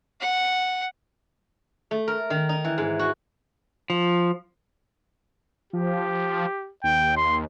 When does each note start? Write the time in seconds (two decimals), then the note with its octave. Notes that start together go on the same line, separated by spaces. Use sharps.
0.21 F#5
1.91 A3
2.08 A#4
2.30 D#3
2.49 D#4
2.64 E3
2.78 G#2
2.99 F#4
3.90 F3
5.73 F3 G4
6.84 D#2 G5
7.17 C6